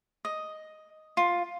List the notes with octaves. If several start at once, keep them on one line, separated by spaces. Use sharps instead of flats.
D#5
F4